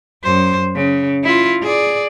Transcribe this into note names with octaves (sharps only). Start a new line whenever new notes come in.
F#2 C5
C#3
E4 F4
G#4 D5